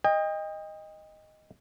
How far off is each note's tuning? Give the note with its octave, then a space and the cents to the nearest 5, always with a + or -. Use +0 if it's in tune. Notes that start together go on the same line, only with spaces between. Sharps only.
D#5 +0 G5 +35